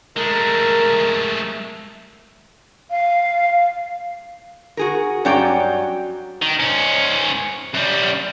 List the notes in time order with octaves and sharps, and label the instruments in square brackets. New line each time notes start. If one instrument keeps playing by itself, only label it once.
[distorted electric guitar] G#3 A3 [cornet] A#4
[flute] F5
[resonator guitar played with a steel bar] F#4 G#4 A#4
G2 F#3 C#4 D5 G5 A#5
[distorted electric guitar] D#3
G#2 C#4
F#2 G3